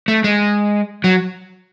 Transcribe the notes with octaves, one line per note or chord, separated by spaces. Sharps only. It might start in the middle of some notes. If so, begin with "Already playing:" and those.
A3
G#3
F#3